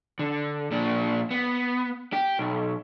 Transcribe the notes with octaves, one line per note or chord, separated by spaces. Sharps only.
D3
A#2 D4
B3
G4
B1